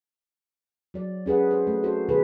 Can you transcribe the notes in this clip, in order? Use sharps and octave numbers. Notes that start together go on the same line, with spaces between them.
F#3 D5
C#4 G#4 B4 F#5
F#4 C5
A3
F#4 A4 C5
B2 D#3 G#4 B4